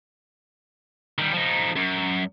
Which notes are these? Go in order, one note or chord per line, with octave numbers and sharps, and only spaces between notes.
D#3 G3
F3 D#4
F#2